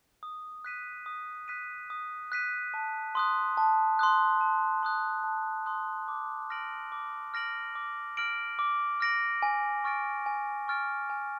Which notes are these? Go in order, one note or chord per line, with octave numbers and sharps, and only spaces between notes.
D#6
F#6 B6 D#7
D#6
F#6 B6 D#7
D#6
F#6 B6 D#7
A5
C6 D#6 F#6
A5
C6 D#6 F#6
A5
C6 D#6 F#6
A5
C6 D#6 F#6
D6
F6 A#6 D7 F#7
D6
F6 A#6 D7 F#7
D6
F6 A#6 D7 F#7
D6
F6 A#6 D7 F#7
G#5
C#6 F6 A6 D7
G#5
C#6 F6 A6 D7
G#5